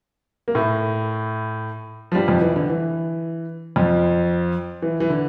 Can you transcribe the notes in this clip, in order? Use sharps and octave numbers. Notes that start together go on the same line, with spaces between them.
A#3
A2 A3
F3
G2 G3
F2 F3
E3
D3
E3
F2 F3
E3
E3
D3